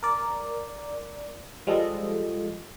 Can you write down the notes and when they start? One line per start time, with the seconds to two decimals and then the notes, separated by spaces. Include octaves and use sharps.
0.03 A#4 D5
1.67 F3 G3 G#3 F4 A4 D#5